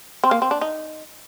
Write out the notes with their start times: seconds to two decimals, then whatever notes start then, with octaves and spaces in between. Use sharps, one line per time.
0.24 C4
0.31 A#3
0.42 C4
0.51 D4
0.61 D#4